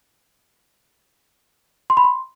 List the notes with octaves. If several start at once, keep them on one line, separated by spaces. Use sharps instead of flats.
C6
B5
C6